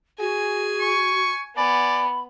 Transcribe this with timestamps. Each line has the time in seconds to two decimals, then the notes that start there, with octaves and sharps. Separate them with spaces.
0.20 F#4 G#4 G#5
0.80 C#6
1.57 B3 D5 G#5 B5